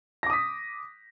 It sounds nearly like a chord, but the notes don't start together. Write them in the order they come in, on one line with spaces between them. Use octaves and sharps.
A#6 D6 D#6 B6